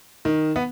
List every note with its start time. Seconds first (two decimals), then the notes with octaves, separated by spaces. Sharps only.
0.25 D#3
0.56 B3